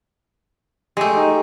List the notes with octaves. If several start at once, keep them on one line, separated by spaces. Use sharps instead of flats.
G#3 A3 G4
D#4